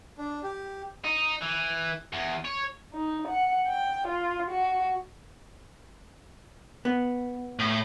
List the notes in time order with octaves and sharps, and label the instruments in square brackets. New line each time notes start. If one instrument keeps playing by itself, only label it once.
[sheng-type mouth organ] D4
G4
[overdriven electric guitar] D#4
E3
E2
C#5
[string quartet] D#4
F#5
G5
F4
F#4
[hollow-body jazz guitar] B3
[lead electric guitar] A2